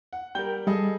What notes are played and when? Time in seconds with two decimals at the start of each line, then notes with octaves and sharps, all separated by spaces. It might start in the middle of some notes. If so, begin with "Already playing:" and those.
0.13 F#5
0.35 G3 A#4 G5 G6 G7
0.67 G3 G#4 A4 D#5